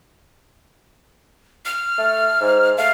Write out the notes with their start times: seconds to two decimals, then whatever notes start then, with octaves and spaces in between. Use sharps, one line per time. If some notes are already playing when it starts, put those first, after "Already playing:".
1.65 F6
1.98 A3
2.41 G#2
2.77 A3 F5